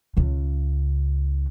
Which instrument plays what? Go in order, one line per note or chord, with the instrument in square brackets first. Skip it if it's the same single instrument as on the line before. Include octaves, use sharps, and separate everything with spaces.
[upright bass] C#2 C#3